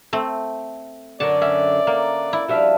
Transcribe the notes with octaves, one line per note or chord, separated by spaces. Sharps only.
A3 C4
F#2 D3 A#4 C#5 D5 A5
C#4 E5
D3 A#3
E4
F3 G3 D4 F#4 E5 F6